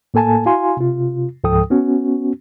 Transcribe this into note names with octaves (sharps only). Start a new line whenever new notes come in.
A2 A#3 A4 G#5 A5
E4 F#4 F5 G#5 C6
C3 F4
C#2 G#2 F3 A4 G5 D#6
B3 C#4 F#4